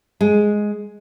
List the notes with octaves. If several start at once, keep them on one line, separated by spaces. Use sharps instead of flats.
G#3